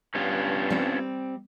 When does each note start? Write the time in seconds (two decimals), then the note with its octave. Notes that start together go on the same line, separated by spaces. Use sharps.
0.15 G2 B3 C#4 F4
0.70 G3 C4